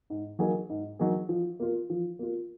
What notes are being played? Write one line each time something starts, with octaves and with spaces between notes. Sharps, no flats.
G#2
F#3 A#3 D#4 G#4
G#2
F#3 A#3 D#4 G#4
F3
A#3 F4
F3
A#3 F4